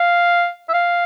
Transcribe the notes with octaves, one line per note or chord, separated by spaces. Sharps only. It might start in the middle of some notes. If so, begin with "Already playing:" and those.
Already playing: F5
E5
F5